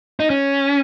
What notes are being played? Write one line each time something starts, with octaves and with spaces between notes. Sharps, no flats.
D#4
C#4